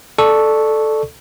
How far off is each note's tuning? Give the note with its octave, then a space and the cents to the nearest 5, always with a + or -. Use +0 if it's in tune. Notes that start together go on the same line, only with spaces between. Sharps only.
A4 -5 D5 +20 C#6 +0